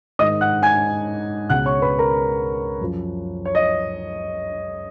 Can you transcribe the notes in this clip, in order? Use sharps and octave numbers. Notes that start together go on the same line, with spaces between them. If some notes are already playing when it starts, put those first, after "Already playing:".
G#2 D#3 D#5 D#6
F#5 F#6
G#5 G#6
C#2 B2 F#5 F#6
C#5 C#6
B4 B5
A#4 A#5
F#2 F3
C#5
D#5